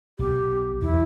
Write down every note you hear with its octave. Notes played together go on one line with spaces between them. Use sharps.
B1 B3 G4
E2 E4